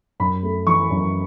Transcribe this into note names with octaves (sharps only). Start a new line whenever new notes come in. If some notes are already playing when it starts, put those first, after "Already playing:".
F#2 B5
A3
E3 C#6
F#2